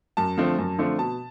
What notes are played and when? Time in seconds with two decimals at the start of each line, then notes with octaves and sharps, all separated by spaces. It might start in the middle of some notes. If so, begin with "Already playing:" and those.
0.17 F#2 A5
0.37 D3 F3 A3 C4
0.58 F#2
0.78 D3 F3 A3 C4
0.98 B2 A5